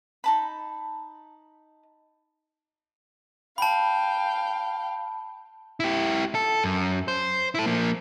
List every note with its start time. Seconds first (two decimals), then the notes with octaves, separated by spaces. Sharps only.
0.24 D#4 A5 B5
3.58 F5 G5 A5 B5
5.80 E4 G4
6.35 A4
6.64 F#2
7.08 C5
7.55 E4 A4
7.66 F3 A#3